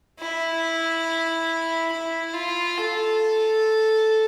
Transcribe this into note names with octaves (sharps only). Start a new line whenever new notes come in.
E4
E4
F4
A4